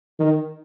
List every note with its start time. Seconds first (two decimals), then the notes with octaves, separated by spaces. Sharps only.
0.19 D#3